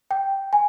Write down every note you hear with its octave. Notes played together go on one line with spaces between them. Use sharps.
G5
G#5